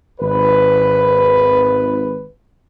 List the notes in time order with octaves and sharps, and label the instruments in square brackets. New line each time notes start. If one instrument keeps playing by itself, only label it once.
[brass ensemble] G#1 B4